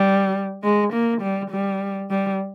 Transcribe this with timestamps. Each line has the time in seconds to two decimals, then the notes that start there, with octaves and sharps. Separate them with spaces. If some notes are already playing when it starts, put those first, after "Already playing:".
Already playing: G3
0.63 G#3
0.93 A#3
1.22 G3
1.51 G3
2.10 G3